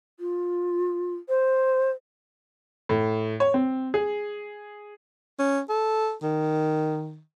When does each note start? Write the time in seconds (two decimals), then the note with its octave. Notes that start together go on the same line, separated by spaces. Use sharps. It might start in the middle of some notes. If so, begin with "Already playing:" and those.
0.20 F4
1.29 C5
2.89 A2
3.40 C#5
3.54 C4
3.94 G#4
5.39 C#4
5.69 A4
6.22 D#3